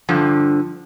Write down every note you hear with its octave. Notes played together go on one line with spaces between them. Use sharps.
G2 D3 F3